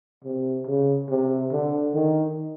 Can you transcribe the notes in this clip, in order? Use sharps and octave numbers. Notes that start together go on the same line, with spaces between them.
C3
C#3
C3
D3
D#3